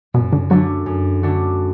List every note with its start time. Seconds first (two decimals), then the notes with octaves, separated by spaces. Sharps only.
0.14 F#2 B2
0.33 D3
0.50 D3 F#3 A3 D4 F#4
0.86 F#2
1.23 D3 A3 D4 F#4